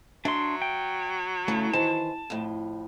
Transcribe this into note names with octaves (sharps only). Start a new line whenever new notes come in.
F#3 D4 E5 C6
G5
C#3 E3 A3
D#3 E3 C5 A5
F2 A2